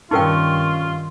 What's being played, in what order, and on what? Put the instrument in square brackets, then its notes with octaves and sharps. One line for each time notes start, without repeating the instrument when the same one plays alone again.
[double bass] G2 D#3 [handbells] C#4 C#6 [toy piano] D#4 A#4 G5 [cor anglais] F4